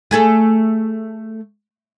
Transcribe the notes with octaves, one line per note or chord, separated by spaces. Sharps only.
A3 G#4 A4